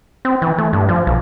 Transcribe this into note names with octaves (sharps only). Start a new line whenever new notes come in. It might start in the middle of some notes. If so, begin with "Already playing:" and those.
C4
E3
A3
G2
F3
B1